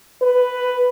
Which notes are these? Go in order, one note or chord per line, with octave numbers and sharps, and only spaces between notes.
B4